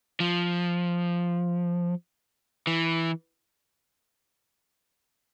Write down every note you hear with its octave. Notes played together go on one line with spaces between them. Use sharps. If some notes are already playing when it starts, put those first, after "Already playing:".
F3
E3